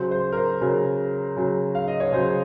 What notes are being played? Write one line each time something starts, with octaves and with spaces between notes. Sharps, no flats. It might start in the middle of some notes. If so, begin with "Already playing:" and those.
Already playing: C#3 F#3 C5
C5
A#4
C5
C#3 F#3 A#4
C#3 F#3
F5
D#5
C#5
C#3 F#3 C5